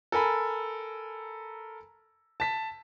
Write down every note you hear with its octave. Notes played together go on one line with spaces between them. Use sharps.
A4 A#4 G#5 B5
A5 B6